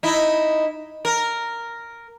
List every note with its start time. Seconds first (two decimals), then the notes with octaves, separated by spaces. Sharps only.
0.03 D#4 E4
1.05 A#4